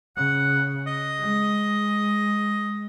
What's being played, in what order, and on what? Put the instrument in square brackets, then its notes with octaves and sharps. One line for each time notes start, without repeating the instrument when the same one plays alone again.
[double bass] C#3 [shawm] F#5
[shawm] D#5
[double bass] G#3